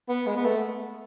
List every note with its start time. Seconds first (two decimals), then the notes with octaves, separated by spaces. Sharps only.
0.09 B3
0.27 G#3
0.37 B3
0.45 A3